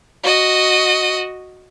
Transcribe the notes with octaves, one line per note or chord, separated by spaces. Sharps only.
F#4 D#5